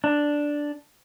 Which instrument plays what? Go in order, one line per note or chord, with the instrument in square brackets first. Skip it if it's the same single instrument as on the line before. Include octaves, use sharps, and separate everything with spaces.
[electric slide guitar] D4